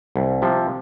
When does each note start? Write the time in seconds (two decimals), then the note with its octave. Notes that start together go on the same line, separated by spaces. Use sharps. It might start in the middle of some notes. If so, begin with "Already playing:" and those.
0.16 C2
0.42 C3 F3